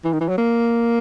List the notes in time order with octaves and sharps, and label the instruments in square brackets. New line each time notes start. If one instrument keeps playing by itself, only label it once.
[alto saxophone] E3
D#3
E3
F#3
A#3